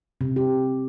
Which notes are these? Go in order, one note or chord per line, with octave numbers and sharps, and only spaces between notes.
C3
G4